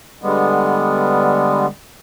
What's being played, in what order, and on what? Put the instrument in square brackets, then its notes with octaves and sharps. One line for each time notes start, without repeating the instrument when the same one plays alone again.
[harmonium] D3 G3 G#3 B3